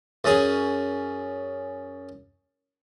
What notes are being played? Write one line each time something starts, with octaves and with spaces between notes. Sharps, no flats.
F#2 C#4 G#4